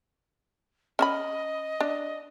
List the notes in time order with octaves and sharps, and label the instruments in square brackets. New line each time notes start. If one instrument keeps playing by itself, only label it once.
[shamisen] C#4 E5 B5 [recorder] D#5
[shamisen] D4